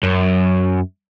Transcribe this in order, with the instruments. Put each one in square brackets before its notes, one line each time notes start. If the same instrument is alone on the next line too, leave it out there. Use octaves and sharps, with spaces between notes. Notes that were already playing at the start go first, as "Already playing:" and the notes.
[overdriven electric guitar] F#2